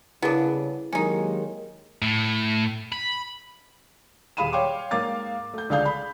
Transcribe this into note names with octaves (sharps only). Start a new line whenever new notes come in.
C2 C#3 B3 D4 E4 G#4 A#4
D#3 F#3 G#3 A#3 C#4 D#4 G4
A2
B5
D#1 G#4 F5 B5 D#7 E7
C#5 F5 G5 C6 D6
G#2 A#3 F5 D6 A6
A3 G6
C#2 D3 D4 G#4 F5 G6
B5